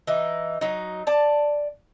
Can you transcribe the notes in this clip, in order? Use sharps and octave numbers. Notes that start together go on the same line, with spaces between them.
E3 D#4
F#3 D#4
D5 A5